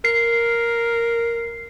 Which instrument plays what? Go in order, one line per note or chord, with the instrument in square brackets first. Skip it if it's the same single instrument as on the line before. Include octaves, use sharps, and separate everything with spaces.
[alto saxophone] A#4 [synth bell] C7